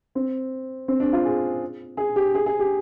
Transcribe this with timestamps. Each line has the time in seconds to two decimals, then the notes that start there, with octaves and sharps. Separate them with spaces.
0.15 C4
0.88 C4
1.00 D4
1.13 F4
1.25 G#4
1.97 G#4
2.16 G4
2.35 G#4
2.46 G#4
2.60 G4